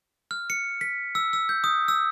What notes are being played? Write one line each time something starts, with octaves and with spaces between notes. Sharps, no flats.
F6
C#7
B6
E6
E6
G6
D#6
E6